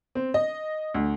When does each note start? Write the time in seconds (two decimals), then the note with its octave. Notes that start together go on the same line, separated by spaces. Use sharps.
0.15 C4
0.34 D#5
0.94 D2